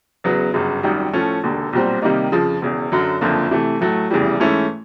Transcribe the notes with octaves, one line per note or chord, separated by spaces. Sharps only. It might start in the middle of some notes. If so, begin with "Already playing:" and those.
E2 C#3 F#3 B3
G1 F#2 C#3
G#1 F#2 D#3 G3
A2 F3 A3 C#4
E1 D#2 D3
B1 A#2 G3 C4
C3 D#3 G3 A#3 D#4
F2 C#3 F3
E1 E2 C#3
F#2 D3 F#3
F#1 F2 D3 F3 A#3
C3 E3 A3
A2 F#3 A3
F1 E2 C#3 E3 G3
G#2 E3 A3 C#4 E4